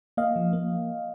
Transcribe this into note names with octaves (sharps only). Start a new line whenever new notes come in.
A#3 D#5 F5
F3
A#3